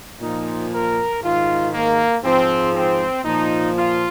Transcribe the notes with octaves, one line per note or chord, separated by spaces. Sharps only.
A#2 F3 D#4
A#4
G#2 D#3 F4
A#3
G#2 F3 C4
C4
A#2 F3 D#4
F4